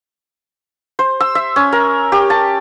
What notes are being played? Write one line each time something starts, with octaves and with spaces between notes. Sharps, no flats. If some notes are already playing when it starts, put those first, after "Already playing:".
C5
E6
E5
C#4
A#4
G4
A5